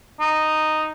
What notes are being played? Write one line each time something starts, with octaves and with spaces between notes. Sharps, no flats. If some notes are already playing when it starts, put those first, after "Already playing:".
D#4